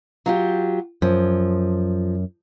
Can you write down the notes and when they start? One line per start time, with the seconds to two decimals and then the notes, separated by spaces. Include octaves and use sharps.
0.26 F#3 F4 G4
1.02 F#2 F3